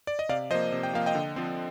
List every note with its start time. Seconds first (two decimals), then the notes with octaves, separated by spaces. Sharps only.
0.07 D5
0.19 D#5
0.29 C3 D5 F5
0.50 F3 C5 D#5
0.55 A#3
0.72 C3
0.83 G5
0.93 F3 A#3 F5
1.06 D#5 G5
1.15 D3
1.36 F3 C4